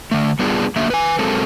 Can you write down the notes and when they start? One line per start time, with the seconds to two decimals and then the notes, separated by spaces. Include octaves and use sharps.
0.11 D3 A3
0.39 G3 B3 D4 F4 G#4
0.76 D3 F#3 A#3 E5
0.90 B4 G#5
1.19 F#3 G#3 C4 A4 A#4